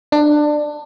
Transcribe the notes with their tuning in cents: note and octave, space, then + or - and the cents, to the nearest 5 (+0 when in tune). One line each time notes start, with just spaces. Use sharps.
D4 +20